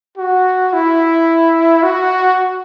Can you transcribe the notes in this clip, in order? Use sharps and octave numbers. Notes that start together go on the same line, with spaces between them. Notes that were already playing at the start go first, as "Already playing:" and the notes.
F#4
E4
F#4